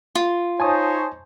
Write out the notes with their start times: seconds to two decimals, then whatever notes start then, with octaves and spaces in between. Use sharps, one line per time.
0.15 F4
0.60 D#4 C5 C#5 G#5 A5 D#6